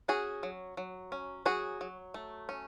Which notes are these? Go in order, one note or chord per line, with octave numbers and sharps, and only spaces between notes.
C#4 F#4 G#4
F#3
F#3
C#4
F#3 F#4 G#4
F#3
A3
C#4